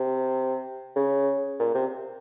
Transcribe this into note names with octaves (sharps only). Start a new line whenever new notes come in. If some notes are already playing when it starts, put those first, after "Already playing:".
Already playing: C3
C#3
A#2
C3